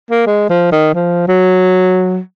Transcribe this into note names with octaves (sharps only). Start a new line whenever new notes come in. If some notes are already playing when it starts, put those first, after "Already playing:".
A#3
G#3
F3
D#3
F3
F#3